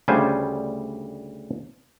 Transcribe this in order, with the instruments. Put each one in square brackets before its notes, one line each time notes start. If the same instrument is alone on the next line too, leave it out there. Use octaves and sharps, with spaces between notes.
[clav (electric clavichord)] D2 C#3 G3 D4 C5 G#5